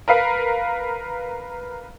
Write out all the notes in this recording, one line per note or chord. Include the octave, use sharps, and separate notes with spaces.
A#4 B4 F5